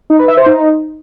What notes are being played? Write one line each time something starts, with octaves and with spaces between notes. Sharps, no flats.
D#4
B4
E5
C5
D#4